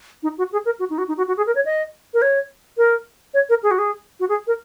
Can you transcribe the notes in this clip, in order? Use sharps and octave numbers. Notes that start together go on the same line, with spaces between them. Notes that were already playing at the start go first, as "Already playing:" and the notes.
D#4
F#4
G#4
A#4
F#4
D#4
F#4
D#4
F#4
F#4
G#4
A#4
C#5
D#5
A#4
C#5
A#4
C#5
A#4
G#4
F#4
G#4
F#4
G#4
A#4